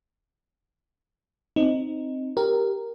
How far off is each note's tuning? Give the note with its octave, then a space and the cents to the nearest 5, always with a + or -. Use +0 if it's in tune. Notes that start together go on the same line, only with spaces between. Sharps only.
C4 +0 D#4 +0
G4 +0 A#4 +0